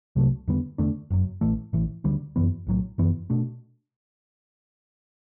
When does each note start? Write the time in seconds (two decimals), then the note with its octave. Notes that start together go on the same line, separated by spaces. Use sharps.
0.16 C2 C3 F#3 A3
0.48 E2 D3 G3 B3
0.78 E2 D3 A3 D4
1.10 F#1 F#2 F#3
1.41 A1 A2 E3 A3
1.73 A1 A2 E3
2.04 D2 D3 G3
2.36 F#2 E3 B3
2.67 B1 A2 F#3
2.98 F#1 F#2 E3 B3
3.30 B2 A3 D4